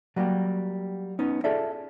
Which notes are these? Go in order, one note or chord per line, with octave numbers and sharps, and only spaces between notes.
F#3 G3 A#3 F#4 G4
B3 C#4 D#4
F4 G#4 A4 D5 E5